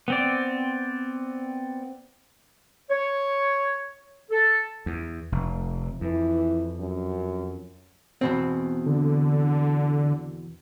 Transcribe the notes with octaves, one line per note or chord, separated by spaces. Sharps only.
B3 C4 D5
C#5
A4
E2
F1
F2 E3
F#2
E2 B2 C4
D3